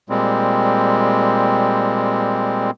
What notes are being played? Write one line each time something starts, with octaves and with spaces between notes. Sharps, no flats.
A#2 G3 G#3 C4